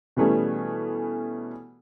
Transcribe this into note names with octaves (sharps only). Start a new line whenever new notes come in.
B2 E3 G3 A3 C#4 G#4